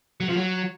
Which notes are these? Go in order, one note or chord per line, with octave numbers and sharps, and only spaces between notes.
F#3
F3
F#3